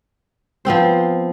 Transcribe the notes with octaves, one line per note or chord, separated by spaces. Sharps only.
F3 B3 C4 C5